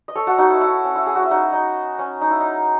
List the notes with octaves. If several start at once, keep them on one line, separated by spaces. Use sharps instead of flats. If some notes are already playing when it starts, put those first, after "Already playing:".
D#5
A4 C#5
F#4 A4
D#4 F#4
E4
E4
C#4
E4
G#4
F#4
E4
D#4 F#4
D#4
C#4
D#4
E4
D#4